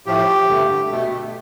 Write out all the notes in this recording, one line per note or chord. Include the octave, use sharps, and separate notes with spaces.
A2 F3 A3 G4
G2 D3 A3
B2 A3